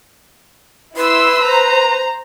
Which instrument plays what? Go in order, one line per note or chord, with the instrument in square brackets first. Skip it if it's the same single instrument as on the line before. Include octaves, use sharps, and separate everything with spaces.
[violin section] E4 C6 E6 [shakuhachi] B4
[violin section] C5 A#5